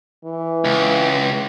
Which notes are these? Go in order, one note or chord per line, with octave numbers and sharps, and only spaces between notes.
E3
C#2